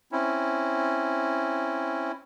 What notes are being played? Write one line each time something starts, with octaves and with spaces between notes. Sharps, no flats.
C4 C#4 E4